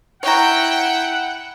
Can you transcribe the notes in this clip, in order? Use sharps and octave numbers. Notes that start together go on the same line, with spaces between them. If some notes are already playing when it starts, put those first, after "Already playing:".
E4 C#5 F#5 G5 A#5